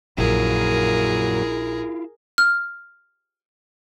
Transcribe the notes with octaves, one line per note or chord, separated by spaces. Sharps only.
A#1 F#2 A#2 F#3 E4 F4 G#4 A#4
F6